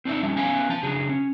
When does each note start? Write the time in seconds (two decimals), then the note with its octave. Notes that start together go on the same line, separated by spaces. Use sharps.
0.05 C4 D4 D#4 E5
0.23 F3 G3 C#4 A5
0.37 B3 C#4 B4 E5 F5 G#5
0.69 F3 A5
0.83 C#3 F#3 D4 G#4
1.09 C#4